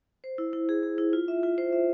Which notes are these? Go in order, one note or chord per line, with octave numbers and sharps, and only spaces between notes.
C5
E4
E4
G#4
G#4
E4
F4
E5
F4
C5
E5